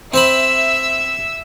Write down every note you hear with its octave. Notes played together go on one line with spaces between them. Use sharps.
C4 C5 E5 B5 E6